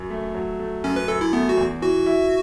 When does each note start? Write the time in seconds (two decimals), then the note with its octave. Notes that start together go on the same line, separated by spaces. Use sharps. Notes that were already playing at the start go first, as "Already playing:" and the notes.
Already playing: F#2
0.10 A3
0.35 F#3
0.60 A3
0.84 F#2 C#4
0.96 B4
1.08 F#2 A4
1.21 E4
1.33 A3 B3
1.49 F#4
1.57 E2
1.82 E3 F#4
2.06 E4